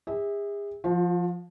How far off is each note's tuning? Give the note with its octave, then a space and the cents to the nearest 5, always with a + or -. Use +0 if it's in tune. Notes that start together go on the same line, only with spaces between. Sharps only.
G#4 -40 E5 -25
F3 +0 F4 +40